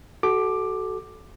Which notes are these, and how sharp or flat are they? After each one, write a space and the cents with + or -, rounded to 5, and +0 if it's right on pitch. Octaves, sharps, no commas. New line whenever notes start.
F#4 +25 A4 -20 D6 +10